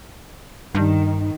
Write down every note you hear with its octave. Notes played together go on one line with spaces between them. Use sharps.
G2 D#3